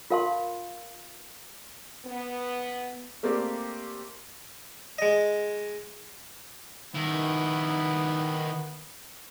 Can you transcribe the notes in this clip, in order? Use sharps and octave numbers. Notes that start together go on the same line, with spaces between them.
F4 A#4 F5 A5 C6
B3
A3 A#3 C4 G4 D5
G#3 D#5
D#3 B3 E4